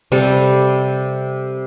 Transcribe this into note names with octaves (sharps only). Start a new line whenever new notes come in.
C3 G3 A4